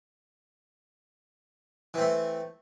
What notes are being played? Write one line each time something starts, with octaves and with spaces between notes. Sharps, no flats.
E3 A3 C4